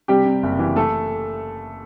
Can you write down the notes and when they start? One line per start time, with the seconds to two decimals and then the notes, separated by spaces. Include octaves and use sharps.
0.08 C3 G3 G4
0.26 C3
0.43 F#1
0.59 E3
0.76 A3 A4